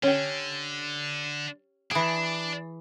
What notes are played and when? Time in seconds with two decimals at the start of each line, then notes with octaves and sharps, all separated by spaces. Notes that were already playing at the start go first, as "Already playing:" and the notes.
0.03 D3 C#4 G4
1.91 E3 D4 G#4